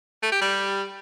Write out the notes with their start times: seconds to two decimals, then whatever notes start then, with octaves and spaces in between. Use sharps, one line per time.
0.23 A3
0.32 G4
0.41 G3